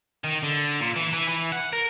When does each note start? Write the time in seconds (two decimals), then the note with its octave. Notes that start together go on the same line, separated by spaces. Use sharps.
0.24 D#3
0.43 D3
0.80 A#2
0.96 E3
1.13 E3
1.28 E3
1.52 F#5
1.73 A#4